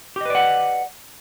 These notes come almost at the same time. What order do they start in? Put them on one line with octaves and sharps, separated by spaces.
G4 D#5 B4 D5 F#5